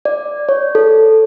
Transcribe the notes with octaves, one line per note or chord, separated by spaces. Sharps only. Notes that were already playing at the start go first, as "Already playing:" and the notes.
D5
C#5
A4